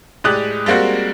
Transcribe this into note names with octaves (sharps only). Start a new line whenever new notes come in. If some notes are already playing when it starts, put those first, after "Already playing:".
A2 G#3 G4 D5 D#6 F#6
G3 G#3 A#3 C4 F#4